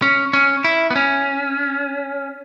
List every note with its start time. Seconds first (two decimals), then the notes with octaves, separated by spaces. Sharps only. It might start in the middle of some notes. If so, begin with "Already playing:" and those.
0.02 C#4
0.33 C#4
0.64 E4
0.91 B3
0.96 C#4